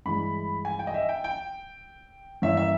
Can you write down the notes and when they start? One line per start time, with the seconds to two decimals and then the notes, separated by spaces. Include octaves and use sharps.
0.05 G2 E3 G#3 B5
0.65 G#5
0.79 G5
0.87 D#5
0.94 E5
1.09 G5
1.24 G5
2.42 G2 E3 A#3 C#4 E5
2.57 E5